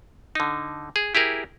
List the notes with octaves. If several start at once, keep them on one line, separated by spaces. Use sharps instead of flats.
D3 D#4
G#4
E4 G4 G#4 A#4